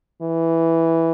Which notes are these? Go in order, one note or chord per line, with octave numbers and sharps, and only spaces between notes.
E3